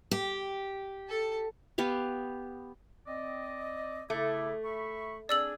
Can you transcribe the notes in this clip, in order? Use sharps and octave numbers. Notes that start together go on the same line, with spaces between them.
G4
A4 A5
B3 G4 F5
C4 D5 D#5
C#3 A3 E4 D6
E5 B5 C#6
C4 D4 G#4 D5 E6 F#7